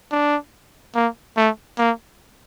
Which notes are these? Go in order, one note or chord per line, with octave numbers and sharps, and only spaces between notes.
D4
A#3
A3
A#3